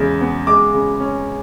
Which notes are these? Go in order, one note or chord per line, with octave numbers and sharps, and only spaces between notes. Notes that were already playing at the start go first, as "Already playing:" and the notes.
Already playing: E2 C#3 G#3
B3
G#3 D6
C#3
C#4